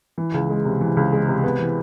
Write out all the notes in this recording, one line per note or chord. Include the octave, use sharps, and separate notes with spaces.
E3
C#2
G#3
C3
E3
C#2
G#3
C3
B3
E3